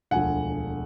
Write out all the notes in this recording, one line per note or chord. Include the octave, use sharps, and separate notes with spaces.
E1 D2 D3 F3 F#5 G#5